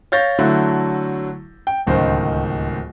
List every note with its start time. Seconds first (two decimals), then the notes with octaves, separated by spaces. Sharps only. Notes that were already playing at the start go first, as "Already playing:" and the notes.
0.12 C#5 F5 G6 A6 A#6
0.39 D3 F#3 A3 E4
1.67 G5
1.87 D1 C#2 D#3 C5